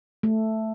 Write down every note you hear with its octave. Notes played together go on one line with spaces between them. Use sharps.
A3